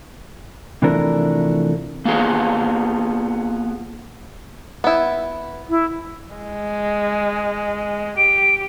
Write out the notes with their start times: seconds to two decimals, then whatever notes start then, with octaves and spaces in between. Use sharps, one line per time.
0.82 C3 E3 F3 A3 D4 A#4
2.05 A#3 B3 F4 G#4
4.84 B3 E4
5.70 E4
6.35 G#3
8.18 G4 D7